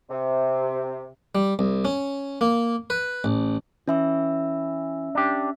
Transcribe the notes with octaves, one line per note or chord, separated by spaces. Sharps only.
C3
G3
C2
C#4
A#3
B4
A1
E3 C#4 E5 E6
D4 G4